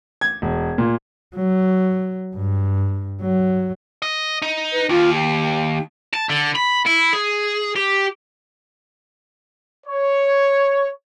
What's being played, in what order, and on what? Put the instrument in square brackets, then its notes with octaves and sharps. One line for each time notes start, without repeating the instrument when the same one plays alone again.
[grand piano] G#6
E1
A#2
[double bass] F#3
G2
F#3
[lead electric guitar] D#5
D#4
[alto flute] B4
[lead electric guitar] D#2 [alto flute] F4
[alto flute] G4
[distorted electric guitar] A5
D3
B5
E4
G#4
G4
[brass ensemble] C#5